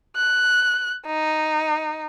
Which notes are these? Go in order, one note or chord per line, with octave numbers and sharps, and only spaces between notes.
F#6
D#4